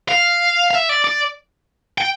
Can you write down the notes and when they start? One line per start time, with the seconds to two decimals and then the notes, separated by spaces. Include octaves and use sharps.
0.09 F5
0.71 F5
0.75 E5
0.89 D5
1.04 D5
1.98 G5